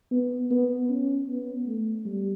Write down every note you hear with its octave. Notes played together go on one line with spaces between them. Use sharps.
B3
B3
C#4
B3
A3
G3